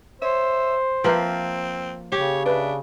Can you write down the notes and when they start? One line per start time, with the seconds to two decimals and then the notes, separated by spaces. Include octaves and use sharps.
0.22 C5 C#5 E5
1.04 F3 A#3 C4 A#4 B4 E5
2.12 C#3 G4 C#5
2.46 D4 B4 E5